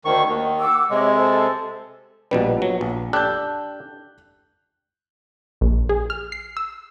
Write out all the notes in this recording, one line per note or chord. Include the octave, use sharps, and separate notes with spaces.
D2 D#3 C5 C#6
D#2 D#3 F#5
F#5 D6 E6
C3 G#3 C#5 D#5
A4 C5
A#1 B2 F3 G3 B3 B4
F#3
A#1
D4 G4 A4 F#6 G6
A#1
G#4
F6
C7
E6